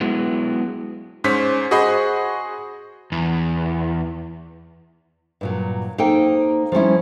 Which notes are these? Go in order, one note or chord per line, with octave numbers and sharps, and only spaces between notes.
F#3 G#3 B3 E4
G#2 C#4 C5 B6
F#4 G#4 C5 D#5 B5
E2
G2 A#2 F#3
A#3 D#4 A4 C5 G5
F3 G3 C#4 E4